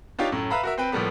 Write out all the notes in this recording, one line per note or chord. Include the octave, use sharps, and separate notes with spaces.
D4 D#4 F4 G4 C#5 F5
F#2 A2
B4 E5 F5 A#5 B5
F#4 A#4 E5
C4 B4 G5
A2 F3 G3 A#3 B3